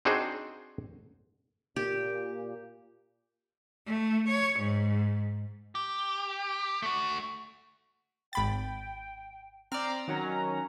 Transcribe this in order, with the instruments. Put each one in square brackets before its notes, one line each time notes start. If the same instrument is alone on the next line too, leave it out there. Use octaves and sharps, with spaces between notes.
[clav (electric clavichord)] C4 D4 D#4 F#4 G#4 C5
[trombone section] A#2 [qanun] G4
[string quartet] A3
C#5
G#2
[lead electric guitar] G4
A3 F#4
[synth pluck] G#1 B5 A6 [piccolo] G5
[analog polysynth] C4 D5 [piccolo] A#5 [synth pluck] F6
[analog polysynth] D#3 F#3 C#4